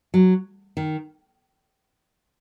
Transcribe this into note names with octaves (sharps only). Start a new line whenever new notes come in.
F#3
D#3